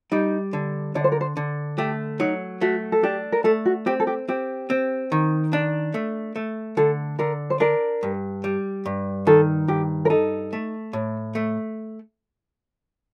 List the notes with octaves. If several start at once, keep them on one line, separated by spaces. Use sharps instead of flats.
G3 D#4
D3
D3 D5
C5
A#4
C5
D3
A3 G4
F#3 D#4
A3 F#4
A4
D4 G4
A#4
A3 A4
F#4
C4 G4
A4
G4
C4 G4
C4
D#3
D4
A3
A3
D3 A4
D3 A#4
C5
D4 A#4
G2
G3
G2
D#3 A4
G2 G4
A#4
D#4 A4
A3
A2
A3